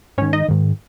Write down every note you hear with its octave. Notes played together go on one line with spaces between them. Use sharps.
G#2 D#3 C#4 C#5
D#4 D#5
G#2 D#3